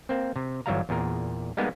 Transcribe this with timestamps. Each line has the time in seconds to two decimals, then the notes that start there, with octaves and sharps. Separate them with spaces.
0.09 A#3 C4
0.36 C3
0.66 G1 E3 F#3 G3 F5 A#5
0.89 E2 A#2 G#4 A#4
1.57 G3 G#3 A#3 B3 D#4 G#4